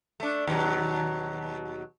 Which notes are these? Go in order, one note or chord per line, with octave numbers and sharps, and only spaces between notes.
A3 D4
D#2 B2 F#3